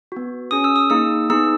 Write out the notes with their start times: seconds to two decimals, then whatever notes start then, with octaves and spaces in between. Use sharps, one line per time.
0.12 B3 F#4
0.51 C#4 G#4 D#6
0.64 E6
0.76 D#6
0.90 A#3 D#4 G#4 E6
1.29 B3 D#4 G#4 E6